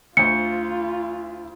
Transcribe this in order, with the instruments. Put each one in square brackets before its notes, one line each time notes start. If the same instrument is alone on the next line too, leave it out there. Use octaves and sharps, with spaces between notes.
[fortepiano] D2 C5 [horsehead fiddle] F4 [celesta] C#7